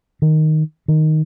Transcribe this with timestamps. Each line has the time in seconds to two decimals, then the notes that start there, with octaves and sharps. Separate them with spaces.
0.22 D#3
0.88 D#3